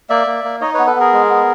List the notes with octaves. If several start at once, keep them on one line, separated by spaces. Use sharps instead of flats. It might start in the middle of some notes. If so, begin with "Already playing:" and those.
A#3 D5 E5
A#3
A#3
D#4 C#5 D#5
B3 B4 C#5
A4 B4
B3 G#4 A#4
G#3
B3